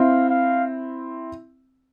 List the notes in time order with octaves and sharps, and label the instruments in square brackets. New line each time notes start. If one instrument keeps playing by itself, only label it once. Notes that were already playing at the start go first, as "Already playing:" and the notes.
Already playing: [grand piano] C4 E4 [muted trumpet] F5
[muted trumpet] F5